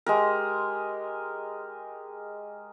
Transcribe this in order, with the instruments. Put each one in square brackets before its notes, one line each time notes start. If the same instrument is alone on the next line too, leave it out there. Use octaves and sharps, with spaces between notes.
[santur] G#3 G4 A#4